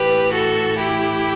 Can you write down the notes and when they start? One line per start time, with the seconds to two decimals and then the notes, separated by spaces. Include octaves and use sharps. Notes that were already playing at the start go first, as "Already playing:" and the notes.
Already playing: A2 E3 G4 B4
0.32 F#4 A4
0.78 E4 G4